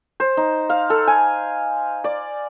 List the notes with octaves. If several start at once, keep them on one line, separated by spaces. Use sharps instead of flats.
C5
D#4
F5
A4
G#5
D5